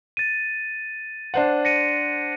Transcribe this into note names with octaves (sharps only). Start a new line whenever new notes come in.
A6 D#7
D4 C5 F#5
A#6 C#7 D#7